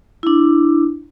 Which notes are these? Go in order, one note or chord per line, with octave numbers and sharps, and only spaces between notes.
D4 E4